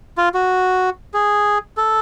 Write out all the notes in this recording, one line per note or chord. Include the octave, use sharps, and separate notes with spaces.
F4
F#4
G#4
A4